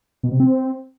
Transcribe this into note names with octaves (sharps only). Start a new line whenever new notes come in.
B2
C3
C4